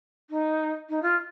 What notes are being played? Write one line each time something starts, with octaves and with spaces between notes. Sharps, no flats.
D#4
D#4
F4